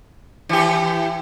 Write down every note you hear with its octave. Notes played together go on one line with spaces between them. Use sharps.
E3 G4